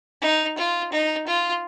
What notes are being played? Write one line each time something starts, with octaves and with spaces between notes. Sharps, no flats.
D#4
F4
D#4
F4